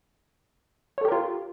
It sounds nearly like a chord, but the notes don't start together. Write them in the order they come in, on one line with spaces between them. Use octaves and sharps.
C#5 A4 G4 A#4 F4